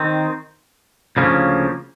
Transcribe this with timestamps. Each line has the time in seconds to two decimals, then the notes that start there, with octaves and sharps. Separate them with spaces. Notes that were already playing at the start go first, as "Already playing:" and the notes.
Already playing: D#3 C4
1.17 D2 C#3 F3 A#3 C#4